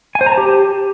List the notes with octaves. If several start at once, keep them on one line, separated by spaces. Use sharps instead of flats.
G#5
C5
A#5
A5
G4